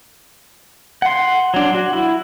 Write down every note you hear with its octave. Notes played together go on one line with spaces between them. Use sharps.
F#5 C6
F#3 D4
F#4
E4